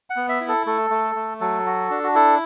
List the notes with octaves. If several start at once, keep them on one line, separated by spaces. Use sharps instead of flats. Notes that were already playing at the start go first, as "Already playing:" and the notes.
F#5
B3
E5
E4
A4
A3 A4
A3
A3
F#3 A4
F#4
D4
F#4
E4 A4